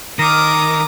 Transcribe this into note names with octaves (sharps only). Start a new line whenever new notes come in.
D#3 A#4 D6 D#6